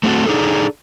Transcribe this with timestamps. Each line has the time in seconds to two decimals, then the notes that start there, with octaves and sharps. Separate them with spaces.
0.03 A3 C4 D#4 F#4 A4
0.26 D4 D#4 G#4 A4